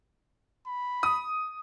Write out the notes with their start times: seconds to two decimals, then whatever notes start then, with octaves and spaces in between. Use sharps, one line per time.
0.67 B5
1.03 D#6